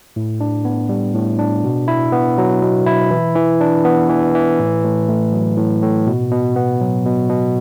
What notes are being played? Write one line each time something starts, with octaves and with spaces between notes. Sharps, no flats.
A2
D4
B3
G3
A2
D4
B2
E4
B3
F#3
B2
E4
E3
E3
D4
B3
E3
E3
A2
A2
A3
F#3
A2
A2
B2
B2
B3
F#3
B2
B2